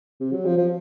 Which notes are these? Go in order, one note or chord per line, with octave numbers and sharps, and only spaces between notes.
C3
F#3
F3
F3